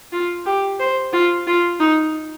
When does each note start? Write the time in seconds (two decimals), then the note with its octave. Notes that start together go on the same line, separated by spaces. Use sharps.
0.13 F4
0.46 G4
0.80 C5
1.13 F4
1.47 F4
1.80 D#4